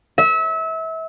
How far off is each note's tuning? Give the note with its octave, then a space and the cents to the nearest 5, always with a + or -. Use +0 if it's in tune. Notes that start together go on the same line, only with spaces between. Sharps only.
E5 -30